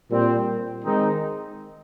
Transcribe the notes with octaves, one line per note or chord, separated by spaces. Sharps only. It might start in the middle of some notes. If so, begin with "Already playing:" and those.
A#2 G3 C4 G4
D#3 G#3 C4 D#4